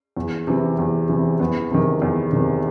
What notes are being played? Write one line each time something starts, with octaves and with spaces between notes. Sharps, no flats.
E2
C3 E3
E2
C3 E3
E2 B3
C3 D#3
E2
C3 D#3